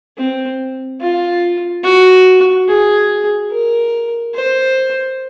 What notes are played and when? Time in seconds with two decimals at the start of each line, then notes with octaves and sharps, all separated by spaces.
0.17 C4
1.00 F4
1.83 F#4
2.67 G#4
3.51 A#4
4.34 C5